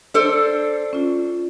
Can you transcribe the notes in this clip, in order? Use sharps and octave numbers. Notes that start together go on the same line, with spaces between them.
D4 A4 C5
C#4 F4